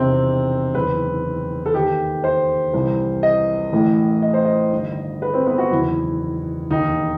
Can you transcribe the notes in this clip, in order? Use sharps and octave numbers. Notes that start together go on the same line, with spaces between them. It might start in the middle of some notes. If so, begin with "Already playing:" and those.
Already playing: E1 E2 C3 D#3 C4
F#1 E2 D#3 B4
A4
D#2 D#3 G4
C5
C2 C3 E3
D#5
A1 A2 E3
D#5
C5
D#5
G1 G2 D#3
B4
C4
B3
F#4
F#1 E2 D#3 E4
E1 D#2 D#3 D#4